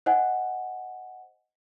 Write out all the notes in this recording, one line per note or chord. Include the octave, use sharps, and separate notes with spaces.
C5 D#5 F#5 G#5